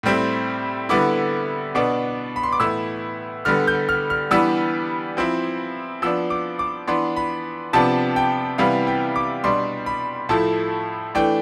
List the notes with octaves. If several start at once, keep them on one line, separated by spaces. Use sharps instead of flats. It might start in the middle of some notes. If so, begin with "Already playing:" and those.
A2 G3 C4 E4
D3 G3 B3 E4 D6
B2 B3 D4 D6
B5
C6
D6
A2 E3 B3 E4 E6
D3 G3 B3 F6
G6
F6
F6
E3 G3 B3 D4 E6
F3 C4 E4
F3 B3 D4 E6
D6
D6
E3 B3 D4 C6
B5
C3 F3 B3 D4 A5
G5
C3 E3 G3 B3 E4 F5
G5
D6
B2 G3 D4 C6
B5
A2 F3 A3 E4 A5
E3 A3 D4 G5